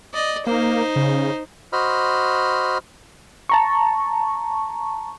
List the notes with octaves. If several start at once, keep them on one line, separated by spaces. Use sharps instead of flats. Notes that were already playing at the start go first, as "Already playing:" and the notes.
D5 D#5
A#3 D#4 C5
C#3
F#4 C5 D#5 B5 F6
A5 A#5 C#6